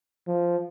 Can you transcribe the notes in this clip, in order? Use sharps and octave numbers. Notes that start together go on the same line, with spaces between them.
F3